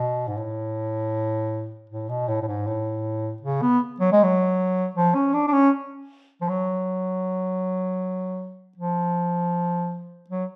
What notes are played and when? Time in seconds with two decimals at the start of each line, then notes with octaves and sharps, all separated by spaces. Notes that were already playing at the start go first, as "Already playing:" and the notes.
Already playing: B2
0.27 G#2
0.37 A2
1.90 A2
2.09 B2
2.28 A2
2.42 A2
2.47 G#2
2.67 A2
3.42 C#3
3.62 B3
4.00 F#3
4.12 G#3
4.24 F#3
4.96 F3
5.15 C#4
5.34 D4
5.47 D4
5.53 C#4
6.41 F3
6.48 F#3
8.77 F3
10.30 F#3